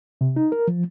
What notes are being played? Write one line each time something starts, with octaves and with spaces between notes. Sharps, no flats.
C3
D#4
A#4
F3